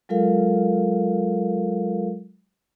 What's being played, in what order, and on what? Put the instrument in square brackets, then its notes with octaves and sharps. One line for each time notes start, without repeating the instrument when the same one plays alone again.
[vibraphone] F#3 G#3 F4 A4 A#4 F5